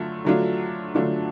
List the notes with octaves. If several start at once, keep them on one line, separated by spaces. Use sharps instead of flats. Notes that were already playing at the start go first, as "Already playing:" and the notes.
Already playing: D3 F#3 A3 F4
D3 F#3 A3 D4 F4
D3 F#3 A3 D4 F4